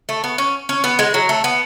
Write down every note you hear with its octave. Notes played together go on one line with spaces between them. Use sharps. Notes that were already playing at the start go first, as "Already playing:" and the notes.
A3
B3
C#4
C#4
B3
G#3
F#3
A3
B3